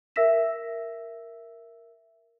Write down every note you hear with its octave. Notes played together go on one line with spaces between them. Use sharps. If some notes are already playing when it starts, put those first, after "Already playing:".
A#4 E5 E6 A#6 B6 E7